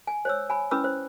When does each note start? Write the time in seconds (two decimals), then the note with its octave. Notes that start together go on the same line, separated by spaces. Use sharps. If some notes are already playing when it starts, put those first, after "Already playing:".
0.07 G#5
0.25 C5 C#5 E6
0.50 G#5 B5
0.71 C#4 E4 B4 B5 D6 E6
0.84 C5